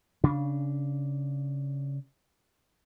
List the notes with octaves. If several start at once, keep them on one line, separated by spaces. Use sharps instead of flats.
C#3 D4